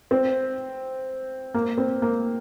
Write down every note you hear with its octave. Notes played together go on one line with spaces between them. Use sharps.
C4
A#3
C4
A#3